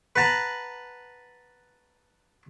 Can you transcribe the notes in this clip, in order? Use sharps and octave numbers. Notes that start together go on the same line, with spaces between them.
B4 F#5 A5 A#5